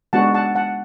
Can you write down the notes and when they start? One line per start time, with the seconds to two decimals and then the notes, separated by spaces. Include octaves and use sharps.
0.13 G#3 B3 D4 F#4 F#5 A5
0.34 F#5 A5
0.55 F#5 A5